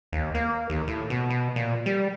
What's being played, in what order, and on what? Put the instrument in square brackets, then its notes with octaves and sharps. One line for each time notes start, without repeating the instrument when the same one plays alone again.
[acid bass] D#2
A#3
D#2
A2
B2
B2
A#2
G3